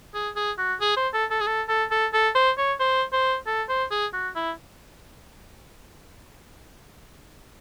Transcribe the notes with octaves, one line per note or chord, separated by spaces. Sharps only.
G#4
G#4
F#4
G#4
C5
A4
A4
G#4
A4
A4
A4
A4
C5
C#5
C5
C5
A4
C5
G#4
F#4
E4